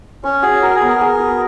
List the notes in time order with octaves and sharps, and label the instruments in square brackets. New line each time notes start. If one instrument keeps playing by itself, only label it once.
[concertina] C#4 [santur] C#5
[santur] F#4 [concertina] G#4
[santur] F#4 [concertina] A#4
[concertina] G#4
[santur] B3
[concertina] A#4
[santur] G#4
B4